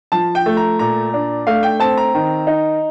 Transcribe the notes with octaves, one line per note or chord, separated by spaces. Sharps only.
F3 A5
G5
A3
A#5
A#2 A#5
D4
A3 F5
G5
C4 A5
A#5
D#3
D#4